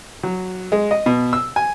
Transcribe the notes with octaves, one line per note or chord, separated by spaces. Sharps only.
F#3
G#3
D#5
B2
E6
G#5